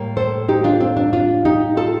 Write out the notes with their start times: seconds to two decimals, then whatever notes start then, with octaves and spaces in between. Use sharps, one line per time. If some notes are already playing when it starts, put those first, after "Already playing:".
Already playing: A2 G3 A#3
0.17 A4 C5
0.49 D#4 G4
0.64 D4 F4
0.81 C4
0.97 D4
1.13 D4 F4
1.45 D#4 G4
1.77 F4 A4